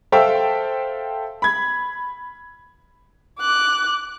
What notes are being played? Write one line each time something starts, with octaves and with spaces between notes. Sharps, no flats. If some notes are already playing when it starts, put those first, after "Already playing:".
A4 C5 E5 F5 G5
B5 G#6
D6 F#6